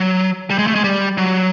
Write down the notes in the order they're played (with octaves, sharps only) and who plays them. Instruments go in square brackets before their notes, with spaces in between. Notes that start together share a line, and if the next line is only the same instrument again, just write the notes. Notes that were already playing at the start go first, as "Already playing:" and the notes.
Already playing: [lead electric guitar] F#3
G3
G#3
A3
G#3
G3
F#3